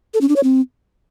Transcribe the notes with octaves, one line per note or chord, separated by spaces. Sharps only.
A4
C#4
D4
C#5
C4